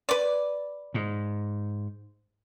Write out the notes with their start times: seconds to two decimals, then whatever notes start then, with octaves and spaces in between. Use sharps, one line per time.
0.09 B4 D5
0.94 G#2